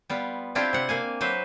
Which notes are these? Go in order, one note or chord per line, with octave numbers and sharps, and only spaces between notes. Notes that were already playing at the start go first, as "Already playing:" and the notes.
G3 B3 F4
C4 D4 E4 F4 G4
C3 F#5
A#3 F5 G#5
F#3 B4 C5 E5